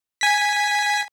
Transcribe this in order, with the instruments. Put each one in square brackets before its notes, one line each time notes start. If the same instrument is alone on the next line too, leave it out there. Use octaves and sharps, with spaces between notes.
[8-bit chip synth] G#5 B6